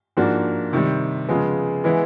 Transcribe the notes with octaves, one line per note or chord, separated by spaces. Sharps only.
G#2 F3 A#3 D4 F#4
C3 D#3 G3
C#3 F3 G#3 B3
E3 G#3 B3 E4